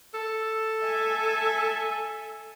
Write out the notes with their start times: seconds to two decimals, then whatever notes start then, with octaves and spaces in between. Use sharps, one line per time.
0.14 A4
0.84 E5 G#5